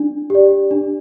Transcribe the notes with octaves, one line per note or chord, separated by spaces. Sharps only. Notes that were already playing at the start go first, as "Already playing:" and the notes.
Already playing: D4
G4 D5
D4